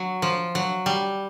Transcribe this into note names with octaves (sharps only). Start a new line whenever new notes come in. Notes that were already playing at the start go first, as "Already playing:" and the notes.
Already playing: F#3
F3
F#3
G3